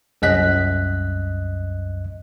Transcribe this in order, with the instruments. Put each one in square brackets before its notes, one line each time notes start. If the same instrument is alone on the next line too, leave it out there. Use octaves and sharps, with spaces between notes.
[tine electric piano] C2 F#2 D#5 F#6 B6